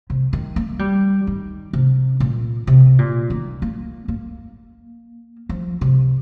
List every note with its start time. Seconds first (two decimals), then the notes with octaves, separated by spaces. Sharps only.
0.10 C3
0.33 D#3
0.56 A#3
0.79 G3
1.27 D#3
1.73 C3
2.20 A#2
2.67 C3
2.99 A#2
3.30 D#3
3.62 A#3
4.08 A#3
5.49 F3
5.81 C3